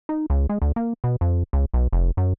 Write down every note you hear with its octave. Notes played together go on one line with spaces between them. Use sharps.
D#4
C#2
G#3
D2
A#3
B2
F2
C#2
B1
F1
F#2